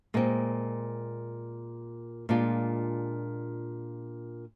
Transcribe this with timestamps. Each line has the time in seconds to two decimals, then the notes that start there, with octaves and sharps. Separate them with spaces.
0.14 A#2 G#3 C4
2.29 A#2 G#3 D4 F4